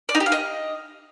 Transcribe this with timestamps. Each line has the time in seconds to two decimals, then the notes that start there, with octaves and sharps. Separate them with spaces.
0.09 D5
0.15 D#4
0.20 G4
0.26 F5
0.32 D#5